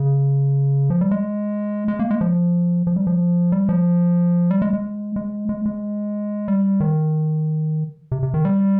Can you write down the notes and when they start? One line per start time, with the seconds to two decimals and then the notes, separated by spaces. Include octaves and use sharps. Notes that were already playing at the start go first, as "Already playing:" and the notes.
Already playing: C#3
0.90 F3
1.01 G3
1.11 G#3
1.88 G#3
1.99 A#3
2.11 G#3
2.21 F3
2.87 F3
2.96 G3
3.07 F3
3.52 G3
3.69 F3
4.51 G3
4.62 G#3
4.73 G#3
5.16 G#3
5.49 G#3
5.66 G#3
6.48 G3
6.80 D#3
8.12 C3
8.23 C3
8.34 D#3
8.45 G3